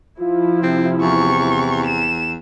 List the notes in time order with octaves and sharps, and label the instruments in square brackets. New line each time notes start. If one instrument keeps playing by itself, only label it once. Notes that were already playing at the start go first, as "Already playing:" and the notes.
[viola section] F3 E4 [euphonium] F4
[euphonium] C3 [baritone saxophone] C4
[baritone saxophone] E2 [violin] C#6
[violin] E7